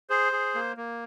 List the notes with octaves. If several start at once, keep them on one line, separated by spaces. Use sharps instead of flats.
G#4 C5
G#4
A#3
A#3